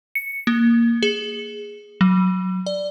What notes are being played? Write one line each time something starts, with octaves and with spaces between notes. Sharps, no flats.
C#7
A#3
G#4
F#3
D5